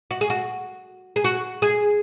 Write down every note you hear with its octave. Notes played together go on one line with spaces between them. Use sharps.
F#4
G#4
F#4
G#4
F#4
G#4